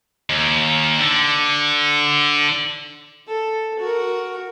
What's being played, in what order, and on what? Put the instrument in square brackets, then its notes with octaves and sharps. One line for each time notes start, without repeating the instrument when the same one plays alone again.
[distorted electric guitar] D#2
D3
[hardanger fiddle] A4
F#4 A#4